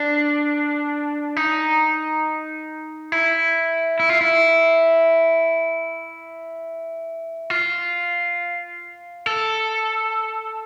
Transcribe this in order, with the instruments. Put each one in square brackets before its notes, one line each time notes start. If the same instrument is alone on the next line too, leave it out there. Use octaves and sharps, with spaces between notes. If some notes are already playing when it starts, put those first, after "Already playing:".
Already playing: [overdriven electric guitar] D4
D#4
E4
E4
F4
E4
F4
A4